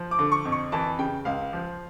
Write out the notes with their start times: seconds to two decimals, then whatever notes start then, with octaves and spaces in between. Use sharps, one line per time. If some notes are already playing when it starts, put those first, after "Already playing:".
Already playing: F3
0.11 D6
0.19 D3
0.32 C#6
0.45 F2
0.52 C#6
0.72 E3 A5
0.98 C#3 G5
1.25 C#2 F5
1.53 F3